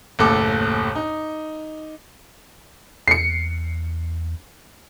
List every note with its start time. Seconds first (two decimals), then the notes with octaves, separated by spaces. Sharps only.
0.19 F#1 D#2 A2 A4 D6
0.95 D#4
3.08 E2 C7 C#7